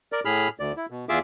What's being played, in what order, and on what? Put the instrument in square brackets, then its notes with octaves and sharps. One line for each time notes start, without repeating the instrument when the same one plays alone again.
[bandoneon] A#4 D5
A2 G#4 B5 F6
D2 D5
E4
B2
E2 F4 G#4 E5 D6